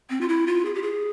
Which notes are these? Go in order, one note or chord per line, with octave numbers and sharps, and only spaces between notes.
C4
F4
E4
F4
G#4
G4
G#4